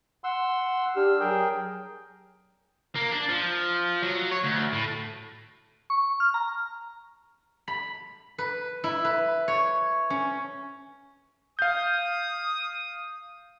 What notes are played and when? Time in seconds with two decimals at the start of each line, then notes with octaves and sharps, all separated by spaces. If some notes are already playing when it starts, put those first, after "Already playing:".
0.24 F#5 C6 E6
0.96 D4 G4 E6 F6
1.20 F#3 G#4 A#4 G5
2.95 A#3
3.11 D4
3.29 F3
4.02 F#3
4.31 C#5
4.44 D2
4.73 A2
5.90 C#6
6.20 F6
6.34 A#5
7.68 B5
8.38 B4
8.84 E4
9.05 B4
9.48 C#5
10.10 C#4
11.59 F5 D#6 G6